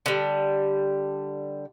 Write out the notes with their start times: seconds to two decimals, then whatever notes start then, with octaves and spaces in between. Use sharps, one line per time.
0.06 D3 G3